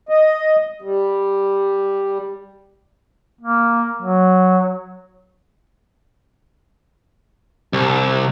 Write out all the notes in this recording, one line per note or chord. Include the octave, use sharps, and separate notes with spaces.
D#5
G3
A#3
F#3
C2